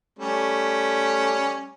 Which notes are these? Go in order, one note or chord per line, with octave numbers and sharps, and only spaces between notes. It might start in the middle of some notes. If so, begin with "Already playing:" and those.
G3 A3 C#4